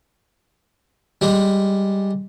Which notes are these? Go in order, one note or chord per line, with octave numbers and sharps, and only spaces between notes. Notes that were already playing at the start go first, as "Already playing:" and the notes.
G3 G#3